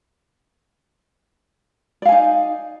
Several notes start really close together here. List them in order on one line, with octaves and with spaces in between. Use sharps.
D5 F5 G#5 D#4